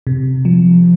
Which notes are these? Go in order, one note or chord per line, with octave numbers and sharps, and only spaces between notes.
C3
F3